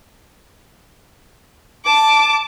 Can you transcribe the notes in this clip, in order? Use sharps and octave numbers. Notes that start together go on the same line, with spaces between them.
A5 D6